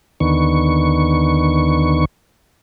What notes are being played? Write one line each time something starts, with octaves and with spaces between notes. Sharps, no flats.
D#2 D3 D#3 B3 C#6